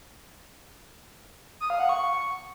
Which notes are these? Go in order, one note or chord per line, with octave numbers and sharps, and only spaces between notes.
D#6
F5
F#5
C#6